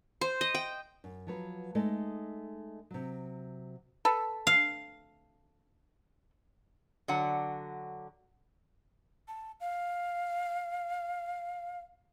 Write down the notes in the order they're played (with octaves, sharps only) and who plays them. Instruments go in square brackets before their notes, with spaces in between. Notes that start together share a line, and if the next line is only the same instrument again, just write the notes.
[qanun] C5
D#5
G5
[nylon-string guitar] F#2
F3 F#3 B4
G#3 A3 D#4 A4 D#5
C3 F#3
[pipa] A4 B4
[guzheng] F5
[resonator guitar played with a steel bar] D3 F#3 F#5
[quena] A5
F5